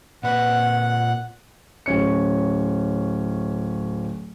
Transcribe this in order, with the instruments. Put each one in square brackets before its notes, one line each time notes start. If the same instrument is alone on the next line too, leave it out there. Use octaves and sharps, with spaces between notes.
[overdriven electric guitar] A#2 B4 [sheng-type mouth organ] F#5
[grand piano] D1 C#4 C#7